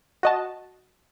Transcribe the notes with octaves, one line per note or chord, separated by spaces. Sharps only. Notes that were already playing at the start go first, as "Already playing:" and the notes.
F#4 D#5 A5